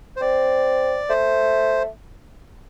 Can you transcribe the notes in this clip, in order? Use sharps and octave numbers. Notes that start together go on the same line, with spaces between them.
C5
C4 D5
A3 C5